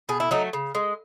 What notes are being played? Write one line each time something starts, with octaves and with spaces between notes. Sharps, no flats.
B2 G#4
E4
F#3 A3 D#4
C#3
G#3